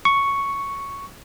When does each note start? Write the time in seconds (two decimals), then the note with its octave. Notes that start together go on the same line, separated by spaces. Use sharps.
0.05 C#6